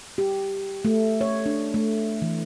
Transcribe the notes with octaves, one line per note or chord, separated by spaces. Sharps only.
G4
A3
C#5
D4
A3
E3